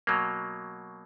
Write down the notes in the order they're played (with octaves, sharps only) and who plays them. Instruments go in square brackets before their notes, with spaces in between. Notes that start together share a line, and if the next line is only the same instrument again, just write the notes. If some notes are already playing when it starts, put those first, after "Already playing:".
[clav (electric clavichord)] B2 F#3 A#3